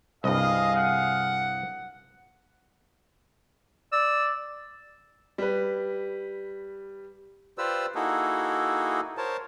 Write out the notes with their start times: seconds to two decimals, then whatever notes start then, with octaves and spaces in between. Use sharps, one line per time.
0.24 C2 G2 G#4 D#5 F5
0.76 F#5
3.92 D5 E6
5.38 G3 B4
7.58 F4 G4 B4 C5 D5 E6
7.95 A#3 D#4 E4 F#4 G#4 A4
9.18 A#4 C5 C#5 A5